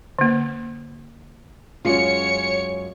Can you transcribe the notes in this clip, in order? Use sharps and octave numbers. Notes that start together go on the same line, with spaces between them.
D3 A#3
F#2 G#3 F4 C#5 C#7